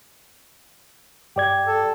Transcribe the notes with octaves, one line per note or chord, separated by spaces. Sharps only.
G2 G4 D5 G#6
A4